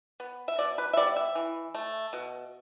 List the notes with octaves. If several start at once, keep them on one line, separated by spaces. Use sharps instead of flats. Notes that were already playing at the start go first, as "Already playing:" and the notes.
B3
E5
B2 D5
B4
E5
G3 B3 D5
E5
E3
A3
B2